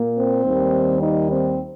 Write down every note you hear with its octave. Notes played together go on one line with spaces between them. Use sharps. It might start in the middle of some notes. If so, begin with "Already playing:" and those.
Already playing: A#2 A#3
C4
D#2 D#3 G3
D#4
C4